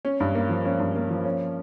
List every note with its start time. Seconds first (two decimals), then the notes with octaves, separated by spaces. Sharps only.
0.05 C#4
0.20 G2
0.35 A#3
0.49 F3
0.65 C#4
0.80 G2
0.95 A#3
1.10 F3
1.24 C#4